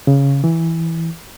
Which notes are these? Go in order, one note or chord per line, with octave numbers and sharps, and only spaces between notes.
C#3
E3